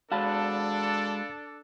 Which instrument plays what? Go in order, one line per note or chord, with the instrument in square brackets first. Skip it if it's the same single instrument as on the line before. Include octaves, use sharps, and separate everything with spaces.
[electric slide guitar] G#3 F#4 [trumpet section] D4 A4 [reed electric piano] F5 A5 B5